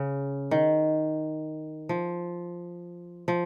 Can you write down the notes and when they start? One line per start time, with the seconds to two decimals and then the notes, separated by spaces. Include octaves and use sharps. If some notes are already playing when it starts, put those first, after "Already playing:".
Already playing: C#3
0.51 D#3
1.89 F3
3.28 F3